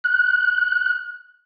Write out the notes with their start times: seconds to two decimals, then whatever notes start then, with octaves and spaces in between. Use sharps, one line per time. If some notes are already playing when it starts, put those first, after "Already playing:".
0.04 F#6